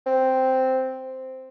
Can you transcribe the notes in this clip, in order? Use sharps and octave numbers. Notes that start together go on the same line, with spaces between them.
C4